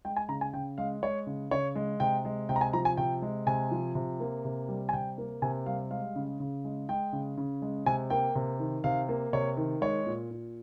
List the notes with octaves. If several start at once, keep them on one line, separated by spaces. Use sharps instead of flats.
G#3 G5
G#5
C#3 A#5
G#5
C#3 G5
G#3 F5
G#3 C#5
C#3
C#3 C#5
G#3
C3 G5
G#3
C3 G5
A#5
G#5
F3 A#5
G#5
C3 G5
G#3
C3 G#5
F3
C3
A#3
C3
G3
G#5
C3 G5
A#3
C3 G#5
G3 F5
G#3 F5
C#3
C#3
G#3
G#3 G5
C#3
C#3
G#3
C3 G#5
A#3 G5
C3
D#3
C3 F5
A#3
C3 C#5
D#3
G#3 C#5
A#2
A#2